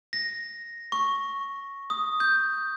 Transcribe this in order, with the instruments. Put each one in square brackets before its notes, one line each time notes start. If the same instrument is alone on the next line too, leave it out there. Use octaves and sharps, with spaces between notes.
[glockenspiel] A#6
C#6
D#6
G6